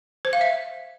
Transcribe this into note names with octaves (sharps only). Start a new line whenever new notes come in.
C5
F5
E5